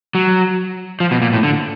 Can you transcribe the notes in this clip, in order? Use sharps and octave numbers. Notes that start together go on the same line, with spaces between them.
F#3
F3
B2
A#2
A2
D3